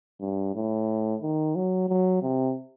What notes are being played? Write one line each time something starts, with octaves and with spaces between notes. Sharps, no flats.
G2
A2
D#3
F#3
F#3
C3